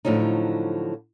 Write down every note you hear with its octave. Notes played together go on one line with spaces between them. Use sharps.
A2 D3 F3 F#3 D#4